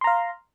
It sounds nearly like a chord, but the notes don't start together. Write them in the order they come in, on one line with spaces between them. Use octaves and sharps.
C6 A#5 F5